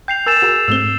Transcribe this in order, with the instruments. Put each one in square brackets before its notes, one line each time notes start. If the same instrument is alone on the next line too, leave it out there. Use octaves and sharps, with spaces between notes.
[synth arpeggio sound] G5 [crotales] G6 C7 F7
[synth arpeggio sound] A#4 G#5 [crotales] E6 A6 E7
[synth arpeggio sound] F#4 G#4 A#4 [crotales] E7
[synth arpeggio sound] G#2 A3 C4 [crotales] E6 G7